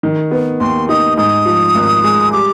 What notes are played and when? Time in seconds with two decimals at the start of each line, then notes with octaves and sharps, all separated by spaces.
0.03 D#3
0.31 B3
0.60 D#2 C6
0.89 D#4 D#6
1.17 G#2 D#6
1.46 F3
1.75 G#1
2.04 G#3
2.32 G3 D6